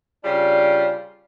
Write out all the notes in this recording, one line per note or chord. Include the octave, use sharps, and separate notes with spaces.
C#3 G3 D4 F4